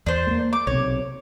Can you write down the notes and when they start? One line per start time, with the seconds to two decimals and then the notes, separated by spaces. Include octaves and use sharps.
0.06 E2 D4 C5
0.27 A3 A#3
0.53 D6
0.67 B1 C3 C#5